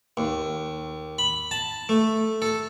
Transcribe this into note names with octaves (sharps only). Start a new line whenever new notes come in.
D#2
B5
A5
A3
A4